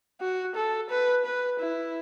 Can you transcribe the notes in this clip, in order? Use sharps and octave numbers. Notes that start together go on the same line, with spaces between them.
F#4
A4
B4
B4
E4